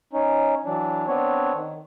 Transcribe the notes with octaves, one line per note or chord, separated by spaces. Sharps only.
C#4 D#4
E3 F#3 D4
B3 C4 D4 C#5
D#3